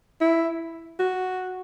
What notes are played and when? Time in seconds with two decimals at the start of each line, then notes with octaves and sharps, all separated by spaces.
0.21 E4
0.99 F#4